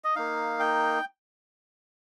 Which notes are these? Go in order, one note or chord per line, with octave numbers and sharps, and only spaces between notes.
D#5
A#3 D#4 F5
G5